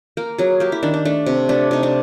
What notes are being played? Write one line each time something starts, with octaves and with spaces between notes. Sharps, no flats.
A#3 A#4
F#3 G#4
A#3 G4
E4
D#3 D4
D4
A3 D4
C3
A3 D4
C3 D#4
D4